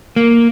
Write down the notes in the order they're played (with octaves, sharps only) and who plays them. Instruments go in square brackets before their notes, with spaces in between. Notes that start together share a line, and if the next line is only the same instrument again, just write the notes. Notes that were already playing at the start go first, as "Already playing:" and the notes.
[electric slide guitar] A#3